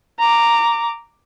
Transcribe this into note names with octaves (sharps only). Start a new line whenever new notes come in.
A#5 D6